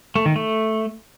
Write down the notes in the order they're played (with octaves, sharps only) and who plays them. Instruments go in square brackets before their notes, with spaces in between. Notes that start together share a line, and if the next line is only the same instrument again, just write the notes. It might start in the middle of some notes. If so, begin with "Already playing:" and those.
[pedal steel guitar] A3
D#3
A3